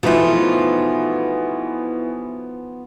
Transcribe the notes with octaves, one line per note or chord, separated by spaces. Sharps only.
B2 E3 F3 A3 B3 D#4 F4